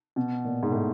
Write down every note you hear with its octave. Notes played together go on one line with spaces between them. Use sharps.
B2
A#2
G#2
A2